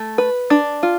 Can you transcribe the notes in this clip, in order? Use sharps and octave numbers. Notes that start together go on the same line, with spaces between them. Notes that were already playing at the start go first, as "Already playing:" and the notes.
Already playing: A3
B4
D4
F4